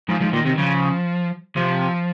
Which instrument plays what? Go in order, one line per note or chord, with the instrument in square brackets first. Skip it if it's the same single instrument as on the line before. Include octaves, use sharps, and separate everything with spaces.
[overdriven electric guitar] G#2 [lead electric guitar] F3
[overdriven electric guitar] G#2 [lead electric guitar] F3
[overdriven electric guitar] A#2 [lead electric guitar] D#3
[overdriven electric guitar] C3 [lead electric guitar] D#3
[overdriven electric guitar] C#3 [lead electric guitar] F3
[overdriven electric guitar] C3 [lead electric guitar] F3